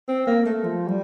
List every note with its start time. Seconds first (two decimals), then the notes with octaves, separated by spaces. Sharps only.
0.08 C4
0.27 A#3
0.45 A3
0.64 F3
0.88 G3